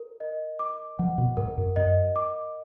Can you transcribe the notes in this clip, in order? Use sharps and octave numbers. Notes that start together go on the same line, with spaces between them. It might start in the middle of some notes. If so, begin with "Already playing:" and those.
Already playing: A#4
D#5
D6
F3 F#5
B2
G#2 A#4
F#2
F#2 D#5
D6